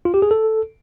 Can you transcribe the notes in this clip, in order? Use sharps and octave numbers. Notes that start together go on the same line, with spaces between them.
F4
G4
G#4
A4